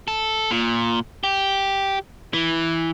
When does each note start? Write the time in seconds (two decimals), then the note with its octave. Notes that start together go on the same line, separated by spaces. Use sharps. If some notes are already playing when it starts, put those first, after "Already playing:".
0.08 A4
0.51 A#2
1.24 G4
2.33 E3